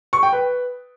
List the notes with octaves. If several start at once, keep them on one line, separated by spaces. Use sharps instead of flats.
C#6
G5
B4